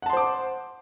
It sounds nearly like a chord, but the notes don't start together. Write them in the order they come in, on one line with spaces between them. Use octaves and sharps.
F#5 A5 C6 C5 D6